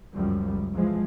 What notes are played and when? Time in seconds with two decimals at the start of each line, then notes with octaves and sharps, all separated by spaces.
0.14 C#2 F#2 F3 G3
0.72 E3 F3 G#3